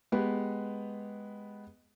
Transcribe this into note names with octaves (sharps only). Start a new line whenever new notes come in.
G#3 B3 G4 B4